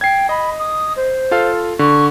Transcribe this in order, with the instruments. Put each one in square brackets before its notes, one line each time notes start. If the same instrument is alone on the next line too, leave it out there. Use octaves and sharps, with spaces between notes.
[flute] G5 [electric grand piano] G#6 C7
[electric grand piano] D#5 [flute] B5
[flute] D#6
C5
[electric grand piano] F4 A4 F5
[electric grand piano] D3 [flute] C#6